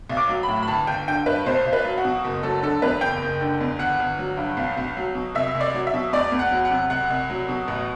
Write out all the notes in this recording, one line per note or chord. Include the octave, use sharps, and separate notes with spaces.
B1
D6
F#3
B5
A2
B5
G1 A5
G1 G5
D3 G5
G2 B4
B1 C5
B1
B4
F#3
F#4
B2
F#1
F#3 A4
D3 A4
E2 B4
F#1 G5
F#1
D3
E2
G1 F#5
G1
F#3
G2
B1
B1
F#3
B2
C2 E5
C2
D5
F#3
E5
B2
E2 D5
E2
F#5
F#3
F#5
C3
C2 F#5
C2
F#3
B2
A1